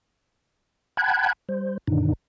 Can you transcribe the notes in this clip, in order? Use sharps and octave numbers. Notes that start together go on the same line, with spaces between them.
F#5 G5 A5 B5 F#6 G#6
G3 C5
F#2 A#2 D3 D#3 D4 D#4